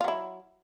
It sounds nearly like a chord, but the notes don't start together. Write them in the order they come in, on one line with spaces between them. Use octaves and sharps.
F4 F#3 E4